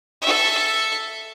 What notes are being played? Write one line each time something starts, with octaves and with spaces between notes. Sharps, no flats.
A4 E5